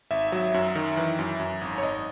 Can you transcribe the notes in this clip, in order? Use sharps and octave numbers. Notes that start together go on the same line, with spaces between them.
G#1 E5
F#3
F#2
D#3
E3
F#2
F#2
G#1
C#5
G#1 D#5